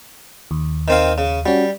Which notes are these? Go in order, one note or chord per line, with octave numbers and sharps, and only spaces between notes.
D#2
D#3 C4 F5
C#3
G3 C#4 F#4